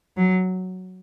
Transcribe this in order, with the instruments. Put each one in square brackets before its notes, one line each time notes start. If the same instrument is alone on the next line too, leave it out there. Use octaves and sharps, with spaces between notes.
[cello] F#3